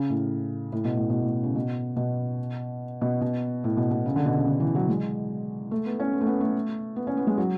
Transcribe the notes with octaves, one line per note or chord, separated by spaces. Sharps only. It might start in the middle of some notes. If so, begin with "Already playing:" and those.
Already playing: C#3
A2
A2
B2
A2
B2
A2
C#3
B2
B2
B2
B2
A2
B2
B2
C#3
D3
B2
C#3
D3
E3
F#3
G#3
A3
B3
C#4
B3
A3
B3
A3
B3
C#4
B3
G#3
F#3